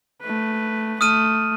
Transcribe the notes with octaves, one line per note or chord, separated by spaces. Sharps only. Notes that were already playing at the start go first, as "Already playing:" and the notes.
A3 B4
A3 D#6 F6 D#7